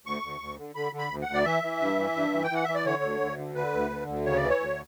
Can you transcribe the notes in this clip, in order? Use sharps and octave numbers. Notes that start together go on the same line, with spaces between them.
D2 C#6
D2
D2
D3
D3 B5
D3
B5
D2
F#5
D2
D5
E3 E5
E3
G2
E3
G2
E3
G5
E3 F#5
E3 E5
D5
D3 C#5
D2
D2
D3
D3 B4
D2
D3
D2
C#3 C#5
D5
E3
C#5
D2